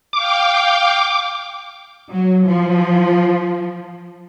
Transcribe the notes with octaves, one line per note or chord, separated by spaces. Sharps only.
F5 G5 D6
F#3
F3